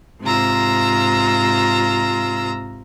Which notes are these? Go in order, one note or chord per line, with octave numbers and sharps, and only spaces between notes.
G#2 C3 F4 A#5 E6